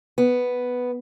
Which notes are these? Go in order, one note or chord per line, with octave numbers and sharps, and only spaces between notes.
B3